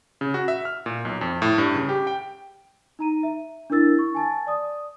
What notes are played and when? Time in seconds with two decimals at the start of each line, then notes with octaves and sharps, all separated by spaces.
0.21 C#3
0.34 F#4
0.48 E5
0.65 F6
0.86 A#2
1.05 B1
1.21 F2
1.42 A2
1.58 G2
1.75 C#3
1.89 G4
2.07 G5
2.99 D#4 A#5 D#7
3.23 E5
3.70 D4 E4 A#4 E6 A6
3.99 C#6
4.15 G#5 A5 A6
4.47 D5 D#6